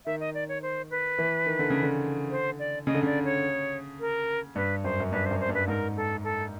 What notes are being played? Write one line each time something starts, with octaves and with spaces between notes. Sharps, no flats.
D#3 E5
D#5
D5
C#5
C5
B4
E3
D#3
D3
C#3
D3
C5
D5
C#3 D#5
D3
C#3 D5
C#5
A#4
G2 B4
F#2 C5
F#2
G2 B4
C5
F#2
C5
G2
B4
G#2 A#4
A4
A4